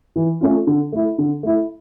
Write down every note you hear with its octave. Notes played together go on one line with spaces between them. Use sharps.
E3
A3 C#4 F4
D3
A3 E4
D3
A3 E4